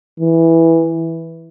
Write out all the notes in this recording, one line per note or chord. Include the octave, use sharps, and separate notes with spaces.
E3